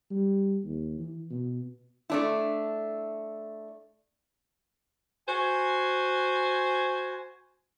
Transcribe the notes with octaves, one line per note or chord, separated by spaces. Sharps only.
G3
D#2
E3
B2
A3 D4 E4
F#4 C5 G#5